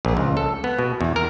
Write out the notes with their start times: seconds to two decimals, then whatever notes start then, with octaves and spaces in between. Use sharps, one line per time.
0.05 A#1
0.17 C#2
0.37 A4
0.64 B3
0.79 B2
1.01 E2
1.16 A#4